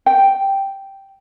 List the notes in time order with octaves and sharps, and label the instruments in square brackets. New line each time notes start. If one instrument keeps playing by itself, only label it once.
[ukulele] G5